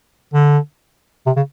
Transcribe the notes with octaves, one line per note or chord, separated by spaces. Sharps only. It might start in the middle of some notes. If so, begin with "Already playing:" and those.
D3
C3
C#3